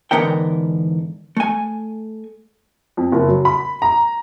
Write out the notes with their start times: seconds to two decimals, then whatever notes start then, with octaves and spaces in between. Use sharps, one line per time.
0.11 E2 G#2 D3 B3 A#4 G5
1.37 A3 G#5
2.97 F2
3.12 F#1
3.29 F#3
3.45 B5
3.82 A#5